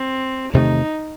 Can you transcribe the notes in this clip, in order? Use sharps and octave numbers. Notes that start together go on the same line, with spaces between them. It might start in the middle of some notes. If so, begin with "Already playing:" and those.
Already playing: C4
E2 C3 D#3 A3 D#4